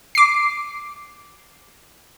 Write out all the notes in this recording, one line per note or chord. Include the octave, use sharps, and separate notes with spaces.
D6 C7